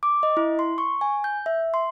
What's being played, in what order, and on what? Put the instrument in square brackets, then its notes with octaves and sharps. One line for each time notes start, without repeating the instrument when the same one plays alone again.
[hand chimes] D6
D#5
E4
C6
C#6
G#5
G6
E5
C6